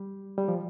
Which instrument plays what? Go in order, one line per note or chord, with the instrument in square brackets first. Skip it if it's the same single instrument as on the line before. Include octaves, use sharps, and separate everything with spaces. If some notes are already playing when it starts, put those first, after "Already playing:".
Already playing: [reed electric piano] G3
G3
F3